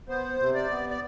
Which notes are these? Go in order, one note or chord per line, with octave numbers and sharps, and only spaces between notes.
B3 C5
C3
D5
B3
D5